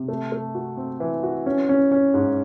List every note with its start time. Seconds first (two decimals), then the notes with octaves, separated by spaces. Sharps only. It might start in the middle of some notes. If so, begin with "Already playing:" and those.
Already playing: C3
0.08 A3
0.32 A3
0.55 F#4
0.77 C4
1.00 E3
1.23 F#4
1.46 C#4
1.69 C#4
1.92 C#4
2.14 G#2